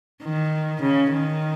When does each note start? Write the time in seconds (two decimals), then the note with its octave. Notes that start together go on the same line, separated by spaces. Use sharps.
0.23 D#3
0.82 C#3
1.11 D#3